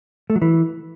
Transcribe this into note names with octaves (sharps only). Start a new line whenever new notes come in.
A3
F#3
E3